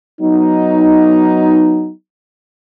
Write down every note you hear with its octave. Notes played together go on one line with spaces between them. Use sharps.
F#3 B3 D#4